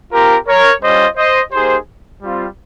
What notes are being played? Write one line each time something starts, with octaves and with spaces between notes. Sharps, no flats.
C4 F4 G4 A#4
A#4 C#5
G3 C#4 F4 C5 D#5
C5 D#5
A#3 D#4 G4 G#4 C5
G3 C4 F4